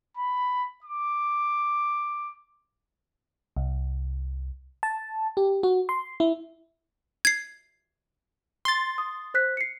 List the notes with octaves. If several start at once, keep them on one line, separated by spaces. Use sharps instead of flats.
B5
D6
C2
A5
G4
F#4
C6
E4
G#6 C7
C6 A6
D#6
C5 F#6 B6
C7 C#7